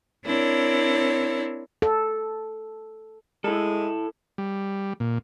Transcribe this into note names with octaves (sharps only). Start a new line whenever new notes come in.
C4 D4 E4 A#4 C#5
A4
G#3 E4 A4
G3
A#2